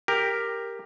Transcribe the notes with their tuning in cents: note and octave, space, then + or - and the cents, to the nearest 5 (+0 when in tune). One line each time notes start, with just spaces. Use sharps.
G4 +10 A#4 +0